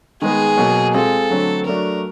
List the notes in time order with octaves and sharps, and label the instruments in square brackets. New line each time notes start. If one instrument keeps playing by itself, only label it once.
[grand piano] D#3 G#3 B3 [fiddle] G#4
[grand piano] B2 F#3 A#3
[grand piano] G#3 C4 F4 G#4 [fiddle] A4
[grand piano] D3 F#3 A3 C4
[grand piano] F#3 A3 D4 F#4 [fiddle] A#4